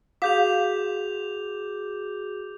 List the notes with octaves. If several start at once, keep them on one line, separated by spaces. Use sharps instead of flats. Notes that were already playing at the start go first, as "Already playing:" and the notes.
F#4 G#4 F5 D6 D#6 G6 F7